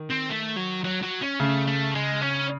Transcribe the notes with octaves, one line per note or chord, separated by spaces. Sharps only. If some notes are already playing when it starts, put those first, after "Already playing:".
Already playing: D#3
C4
A3
F#3
F#3
F#3
C#4
C#3 A3
A3
G#3
C#4